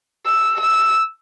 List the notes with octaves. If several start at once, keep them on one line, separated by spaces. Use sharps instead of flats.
E6
E6